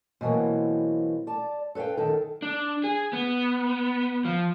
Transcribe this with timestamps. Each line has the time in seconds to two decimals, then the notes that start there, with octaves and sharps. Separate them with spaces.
0.21 B2 E3 F#3 A#3 C4
1.27 D5 A5
1.75 A4 B4 C#5 F5 G5
1.97 F#2 D#3 A4
2.42 D4
2.84 G#4
3.13 B3
4.25 F3